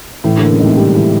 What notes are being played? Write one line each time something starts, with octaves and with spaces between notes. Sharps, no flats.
A2 E3
D3 A#3
C#3
G#2 C3
C3 G3
E3